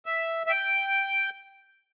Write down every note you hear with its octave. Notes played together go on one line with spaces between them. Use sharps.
E5
E5
G5